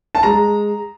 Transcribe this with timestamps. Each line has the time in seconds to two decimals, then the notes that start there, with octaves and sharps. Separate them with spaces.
0.15 A5
0.23 G#3 A#5